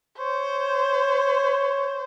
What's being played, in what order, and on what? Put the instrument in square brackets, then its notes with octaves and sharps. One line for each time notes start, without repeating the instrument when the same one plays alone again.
[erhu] C5 [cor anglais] C#5